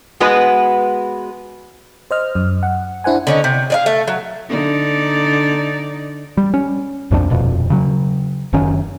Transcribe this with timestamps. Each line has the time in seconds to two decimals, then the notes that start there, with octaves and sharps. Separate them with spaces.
0.20 G#3 B3 F#4 B4 D#5
2.11 C5 D#5 F6
2.35 F#2
2.63 F#5
3.04 D4 E4 C5 F#5 G#5
3.27 D3 C#4 D#4
3.44 C3
3.70 G#4 D5 F5
3.86 A3
4.08 F#3
4.49 D3 D#4 D5
6.37 G3
6.54 C#4
7.11 B1 F2 F3 D4
7.30 D#1 F2 B2
7.70 C#3 F#3
8.53 F#1 F#2 D#3 C#4